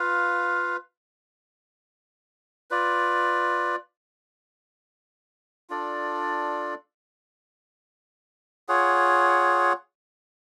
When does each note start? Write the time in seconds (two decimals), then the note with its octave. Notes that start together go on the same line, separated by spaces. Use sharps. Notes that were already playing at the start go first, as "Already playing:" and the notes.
Already playing: F4 B4 F5
2.71 F4 B4 D5
5.70 D4 F4 A4 D5
8.68 F4 G#4 C#5 F#5